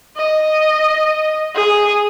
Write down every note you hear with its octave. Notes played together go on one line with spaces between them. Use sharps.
D#5
G#4